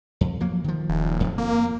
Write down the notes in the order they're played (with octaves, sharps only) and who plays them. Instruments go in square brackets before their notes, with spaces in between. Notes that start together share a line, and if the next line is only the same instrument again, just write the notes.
[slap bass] F2
F3 F#3 A#3
D#3 F3
[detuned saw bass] D#1
[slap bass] F2
[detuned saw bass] A#3